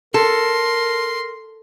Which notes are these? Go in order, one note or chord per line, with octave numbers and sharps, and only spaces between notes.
A4 A#4 C6